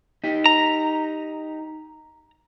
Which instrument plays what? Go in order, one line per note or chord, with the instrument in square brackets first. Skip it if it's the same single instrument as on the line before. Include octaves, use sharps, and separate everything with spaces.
[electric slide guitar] D#4 G4
[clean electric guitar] A#5